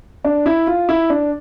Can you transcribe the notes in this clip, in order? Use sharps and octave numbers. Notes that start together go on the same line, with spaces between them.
D4
E4
F4
E4
D4